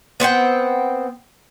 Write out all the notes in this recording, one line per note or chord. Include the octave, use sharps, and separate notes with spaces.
B3 C4 F#5 G5